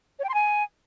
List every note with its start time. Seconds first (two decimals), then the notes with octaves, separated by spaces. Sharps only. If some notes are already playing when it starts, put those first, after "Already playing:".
0.19 C#5
0.24 G5
0.29 C6
0.34 G#5